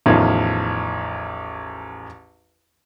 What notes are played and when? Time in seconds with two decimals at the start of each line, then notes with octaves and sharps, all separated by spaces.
0.06 A1 E2 D#3 F3